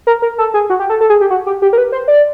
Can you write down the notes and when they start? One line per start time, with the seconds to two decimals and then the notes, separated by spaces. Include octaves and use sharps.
0.07 A#4
0.22 A#4
0.38 A4
0.54 G#4
0.70 F#4
0.80 G4
0.90 A4
1.01 A4
1.10 G#4
1.21 G4
1.30 F#4
1.47 G4
1.62 G4
1.73 A#4
1.78 B4
1.92 C5
2.08 D5